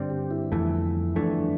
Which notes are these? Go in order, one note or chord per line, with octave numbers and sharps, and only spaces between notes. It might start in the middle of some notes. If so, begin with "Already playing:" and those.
Already playing: G2 D3 G3 C4
G4
E4
G1 F2 E3 A3
G1 F2 E3 A3 D4